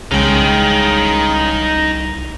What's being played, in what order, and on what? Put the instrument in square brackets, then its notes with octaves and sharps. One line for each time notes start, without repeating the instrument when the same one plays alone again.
[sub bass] C2 [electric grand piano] C#3 G#3 [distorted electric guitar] D#4 G5